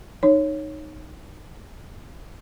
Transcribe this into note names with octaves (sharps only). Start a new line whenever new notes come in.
D#4 C#5